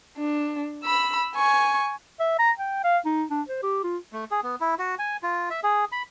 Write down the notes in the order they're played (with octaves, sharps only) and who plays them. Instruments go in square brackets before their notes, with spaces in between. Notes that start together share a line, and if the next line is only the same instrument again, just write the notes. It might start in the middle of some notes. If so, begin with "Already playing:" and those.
[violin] D4
B5 E6
G#5 C#6
[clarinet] E5
A#5
G5
F5
D#4
D4
C5
G4
F4
[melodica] A3
G#4
B3
E4
F#4
G#5
F4
E5
G#4
B5